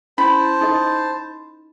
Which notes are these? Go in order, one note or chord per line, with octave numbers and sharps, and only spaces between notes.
C#4 E4 C5 G5 A5 B5
D#4 A4 D#5